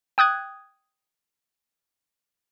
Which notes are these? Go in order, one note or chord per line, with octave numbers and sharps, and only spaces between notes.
G5 D#6 F#6 G#6